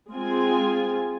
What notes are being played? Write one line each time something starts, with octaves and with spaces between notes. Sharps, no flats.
G#3 C4 F4 G#5